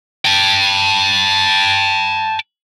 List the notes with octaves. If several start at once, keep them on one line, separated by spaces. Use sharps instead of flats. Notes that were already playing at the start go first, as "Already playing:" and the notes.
G5 A5